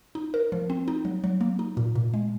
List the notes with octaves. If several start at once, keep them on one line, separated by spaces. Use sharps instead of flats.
D#4
A#4
F3
C4
D#4
F#3
F#3
A#3
D#4
A#2
A#2
G#3